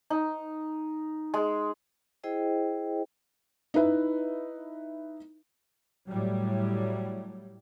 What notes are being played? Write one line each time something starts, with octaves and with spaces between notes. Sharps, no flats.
D#4
G#3
E4 G#4 C5 D#5 G5
D#4 E4 B4 E5
A2 F#3 G3